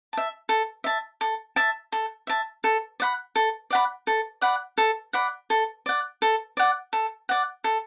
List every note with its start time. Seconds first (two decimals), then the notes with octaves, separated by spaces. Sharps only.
0.13 E5 A5
0.49 A4
0.84 E5 A5
1.21 A4
1.56 E5 A5
1.92 A4
2.27 E5 A5
2.64 A4
3.00 D5 F#5 B5
3.36 A4
3.71 D5 F#5 B5
4.07 A4
4.42 D5 F#5 B5
4.78 A4
5.13 D5 F#5 B5
5.50 A4
5.86 D5 F#5
6.22 A4
6.57 D5 F#5
6.93 A4
7.29 D5 F#5
7.64 A4